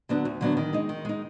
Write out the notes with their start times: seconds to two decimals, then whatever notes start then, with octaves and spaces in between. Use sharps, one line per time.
0.09 D3 F#3 B3 D4
0.25 D2
0.41 D3 F#3 B3 D4
0.57 D#3
0.73 G#3 D#4
0.89 D#3
1.05 G#3 D#4